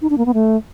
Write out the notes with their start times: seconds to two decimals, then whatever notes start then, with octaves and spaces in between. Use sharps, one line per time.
0.02 D#4
0.10 D4
0.18 A#3
0.26 B3
0.34 A3